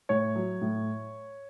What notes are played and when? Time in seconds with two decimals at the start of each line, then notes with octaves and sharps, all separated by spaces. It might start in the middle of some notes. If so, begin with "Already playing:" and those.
0.09 A2 C#5
0.36 F#3
0.62 A2